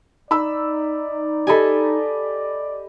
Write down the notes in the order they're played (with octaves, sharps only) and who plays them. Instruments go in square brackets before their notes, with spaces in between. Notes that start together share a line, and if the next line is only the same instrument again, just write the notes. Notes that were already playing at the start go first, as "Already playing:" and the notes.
[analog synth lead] D#4 [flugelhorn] D5 [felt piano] B5 E6
[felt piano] G4 D#5 B5 [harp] A4 G#5